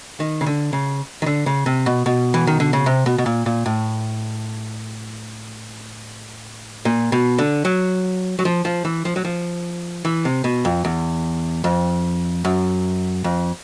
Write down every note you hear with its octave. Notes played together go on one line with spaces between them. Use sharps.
D#3
C#3
D3
C#3
D#3
D3
C#3
C3
B2
B2
E3
D#3
D3
C#3
C3
B2
B2
A#2
A#2
A2
A#2
B2
D3
F#3
F#3
F3
F3
E3
F3
F#3
F3
E3
C3
B2
F2
E2
F2
F#2
F2